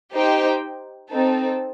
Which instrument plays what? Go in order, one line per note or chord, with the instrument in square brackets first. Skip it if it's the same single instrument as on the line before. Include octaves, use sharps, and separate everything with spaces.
[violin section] D#4 G4 C5 G5
C4 D#4 A4